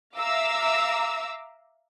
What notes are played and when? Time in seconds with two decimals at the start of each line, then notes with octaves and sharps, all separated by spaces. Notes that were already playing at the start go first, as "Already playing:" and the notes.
0.17 E5 F5 A#5 D6 E6